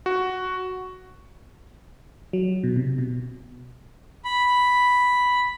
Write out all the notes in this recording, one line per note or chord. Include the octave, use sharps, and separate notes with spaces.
F#4
F#3
B2
C3
B2
B5